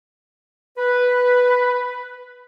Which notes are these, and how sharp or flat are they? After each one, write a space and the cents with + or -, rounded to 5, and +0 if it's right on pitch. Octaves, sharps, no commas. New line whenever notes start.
B4 +0